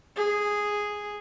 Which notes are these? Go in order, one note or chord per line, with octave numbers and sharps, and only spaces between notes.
G#4